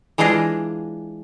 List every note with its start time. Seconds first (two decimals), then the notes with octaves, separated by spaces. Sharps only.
0.18 E3 G#3 D4 F4 G#4 D#5